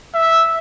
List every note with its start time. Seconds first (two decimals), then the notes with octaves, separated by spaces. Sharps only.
0.14 E5